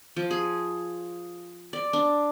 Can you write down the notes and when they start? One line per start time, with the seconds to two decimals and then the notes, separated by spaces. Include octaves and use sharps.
0.16 F3
0.31 G#4
1.73 D5
1.93 D4